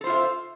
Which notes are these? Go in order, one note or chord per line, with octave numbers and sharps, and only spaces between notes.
F4 A4 C5 E5